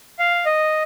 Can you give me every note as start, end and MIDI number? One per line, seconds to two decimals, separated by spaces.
0.19 0.45 77
0.46 0.83 75